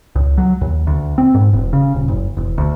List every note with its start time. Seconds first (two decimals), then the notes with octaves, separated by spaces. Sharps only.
0.16 C#2
0.38 F#3
0.61 D#2
0.87 D2
1.18 C4
1.34 G#2
1.53 E1
1.73 C#3
1.94 D#1
2.08 F#1
2.37 E1
2.58 D2